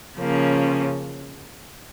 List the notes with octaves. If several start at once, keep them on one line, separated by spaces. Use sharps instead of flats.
C#3 F3 A#3 C#4